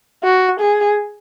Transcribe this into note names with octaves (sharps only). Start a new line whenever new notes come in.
F#4
G#4